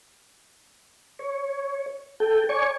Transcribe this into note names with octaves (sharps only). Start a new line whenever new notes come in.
C#5
A4 G5
C#5 D5 G#5 C#6